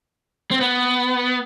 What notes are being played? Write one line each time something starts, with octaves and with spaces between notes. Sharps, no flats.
C4
B3